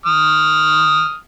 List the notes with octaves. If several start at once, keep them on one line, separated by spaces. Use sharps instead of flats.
D#6 F6